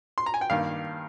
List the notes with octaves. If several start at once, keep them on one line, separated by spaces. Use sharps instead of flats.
C6
A#5
G#5
G5
G2 D#3 A#3 F5